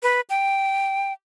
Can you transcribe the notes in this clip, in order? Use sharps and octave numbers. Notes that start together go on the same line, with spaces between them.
B4
G5